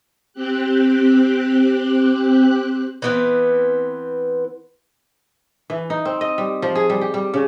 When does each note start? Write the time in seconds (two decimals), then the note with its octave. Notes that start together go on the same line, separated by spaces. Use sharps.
0.33 C4 G4 F#6
3.02 E3 B3 C4
5.70 E3
5.90 D#4
6.05 C4
6.21 D#5
6.38 G3
6.62 F3
6.75 G#4
6.90 G3
7.01 G4
7.14 G3
7.34 C#3